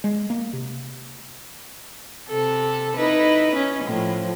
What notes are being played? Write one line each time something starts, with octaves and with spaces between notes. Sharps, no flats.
G#3
A#3
C3
C3 A4
D#4 E4 B4
C#4
A2 F3